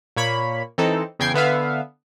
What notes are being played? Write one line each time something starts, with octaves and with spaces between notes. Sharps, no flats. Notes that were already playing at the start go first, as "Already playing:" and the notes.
A#2 A#3 C#5 B5
E3 C4 D#4 A4
E2 C#3 G5 G#6 C7
D3 B3 E5 F5